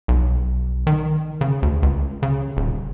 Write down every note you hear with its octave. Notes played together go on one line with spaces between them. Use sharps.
B1
D#3
C#3
D2
C#2
C#3
D#1